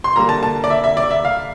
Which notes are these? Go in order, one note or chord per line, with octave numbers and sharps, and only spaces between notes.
C6
D3 G3 A#3 A#5
A5
A5
D5
E5
E5
D5
E5
F5